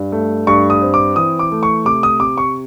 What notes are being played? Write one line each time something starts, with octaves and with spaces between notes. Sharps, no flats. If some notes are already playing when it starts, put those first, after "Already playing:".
Already playing: G2
A3
G2 C#6
D#6
C4
D6
E3 D#6
D6
A3
C#6
C3 D6
D#6
C3 D6
C#6